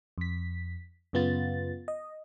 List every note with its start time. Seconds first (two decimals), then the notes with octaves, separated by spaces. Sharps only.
0.18 F2 B6
1.13 F#2 C#3 B3 F4 A6
1.88 D#5